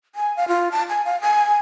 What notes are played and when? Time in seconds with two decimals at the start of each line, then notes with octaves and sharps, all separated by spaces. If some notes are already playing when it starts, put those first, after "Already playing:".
0.15 G#5
0.37 F5
0.48 F4
0.72 A5
0.89 G#5
1.05 F5
1.21 G#5